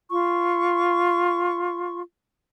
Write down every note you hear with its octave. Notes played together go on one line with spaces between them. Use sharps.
F4 C#6